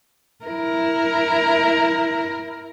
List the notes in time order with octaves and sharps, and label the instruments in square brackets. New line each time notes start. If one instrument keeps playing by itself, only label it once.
[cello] E4 A#4